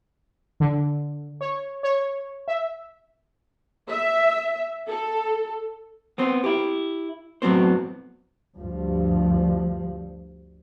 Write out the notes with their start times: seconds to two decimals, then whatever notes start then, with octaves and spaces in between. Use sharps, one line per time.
0.60 D3
1.41 C#5
1.83 C#5
2.48 E5
3.88 E5
4.88 A4
6.18 B3 C4 C5
6.44 E4 G4
7.42 F#2 A2 F#3 B3 C4 C5
8.55 D2 G2 F3